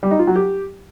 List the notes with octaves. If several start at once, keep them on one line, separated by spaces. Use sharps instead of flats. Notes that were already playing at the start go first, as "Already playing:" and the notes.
G3
D#4
F4
F#3
G4